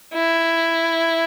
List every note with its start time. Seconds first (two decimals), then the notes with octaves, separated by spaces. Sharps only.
0.14 E4